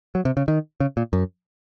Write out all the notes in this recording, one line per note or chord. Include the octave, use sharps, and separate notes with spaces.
F#3
C3
C#3
D#3
C#3
A#2
F#2